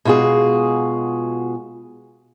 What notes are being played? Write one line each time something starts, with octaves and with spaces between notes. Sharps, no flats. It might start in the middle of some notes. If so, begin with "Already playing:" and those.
B2 G#3 F4 F#4 G#4